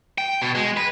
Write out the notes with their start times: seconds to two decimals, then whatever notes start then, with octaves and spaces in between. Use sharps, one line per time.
0.18 G5
0.42 B2
0.55 G#3
0.77 B4